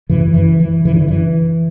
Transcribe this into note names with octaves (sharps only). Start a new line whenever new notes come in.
F#2 C#3 E3
E3
E3
F#2 C#3 E3
D3
E3